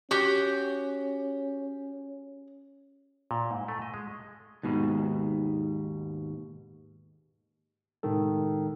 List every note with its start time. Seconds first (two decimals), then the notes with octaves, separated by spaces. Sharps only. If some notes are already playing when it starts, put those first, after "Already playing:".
0.11 C#4 F#4 G4
3.31 A#2
3.51 G#2
3.68 A3
3.82 D#5
3.94 G#3
4.63 D#2 G#2 B2
8.03 A2 C3 D#3 G#3 A4